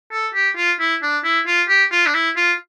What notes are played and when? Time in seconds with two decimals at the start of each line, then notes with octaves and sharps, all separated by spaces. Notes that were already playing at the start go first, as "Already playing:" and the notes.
0.12 A4
0.34 G4
0.56 F4
0.80 E4
1.02 D4
1.24 E4
1.47 F4
1.69 G4
1.92 F4
2.06 D4
2.14 E4
2.37 F4